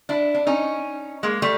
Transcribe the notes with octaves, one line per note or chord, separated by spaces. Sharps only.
D4 E4
D4
C#4 D#4
G#3 A#3
G3 A3